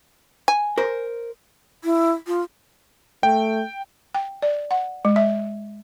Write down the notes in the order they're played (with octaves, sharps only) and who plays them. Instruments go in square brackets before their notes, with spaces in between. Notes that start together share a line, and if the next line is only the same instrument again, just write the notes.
[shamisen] G#5
[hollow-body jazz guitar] A#4 C5
[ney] E4
F4
[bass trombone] A3 [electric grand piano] G5
[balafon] G5
D5
F#5
G#3
E5